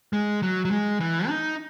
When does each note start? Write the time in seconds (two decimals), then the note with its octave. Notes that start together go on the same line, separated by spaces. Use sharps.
0.13 G#3
0.43 F#3
0.65 F#3
0.71 G#3
1.00 E3
1.28 D#4